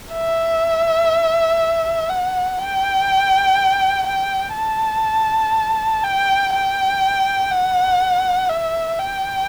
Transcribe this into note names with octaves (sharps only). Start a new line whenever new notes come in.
E5
F#5
G5
G5
A5
G5
G5
F#5
E5
G5